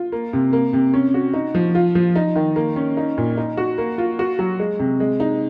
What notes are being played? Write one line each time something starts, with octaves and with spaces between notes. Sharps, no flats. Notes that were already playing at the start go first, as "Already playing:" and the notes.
Already playing: F4
A#3
C3
A#3
C3
C#4
F#4
D#4
F3
F4
F3
D#4
D#3
A#3
C#4
D#4
A#2
D#4
F#4
A#3
F4
F#4
F#3
G#3
C3
G#3
D#4